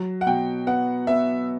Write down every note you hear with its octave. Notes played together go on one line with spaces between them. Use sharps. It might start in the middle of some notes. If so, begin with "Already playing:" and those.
Already playing: F#3
F#5
B2 G5
B3 F#5
B3 E5